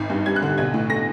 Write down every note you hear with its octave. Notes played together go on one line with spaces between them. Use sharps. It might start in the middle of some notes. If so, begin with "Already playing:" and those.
Already playing: G#1
G2
G3 G#6
F#6
D3
B1 G#6
A2
A3 A#6